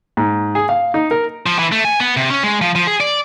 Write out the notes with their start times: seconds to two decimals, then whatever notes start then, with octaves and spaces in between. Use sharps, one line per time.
0.17 G#2
0.55 G#4
0.69 F5
0.94 D#4
1.11 A#4
1.46 F3
1.59 E3
1.72 A3
1.85 G#5
2.00 B3
2.17 C3
2.30 C#4
2.43 G#3
2.61 F3
2.75 F3
2.87 G#4
3.00 D5